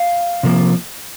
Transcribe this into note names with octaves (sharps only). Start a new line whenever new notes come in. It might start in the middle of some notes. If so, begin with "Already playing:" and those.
Already playing: F5
C3 F3 A#3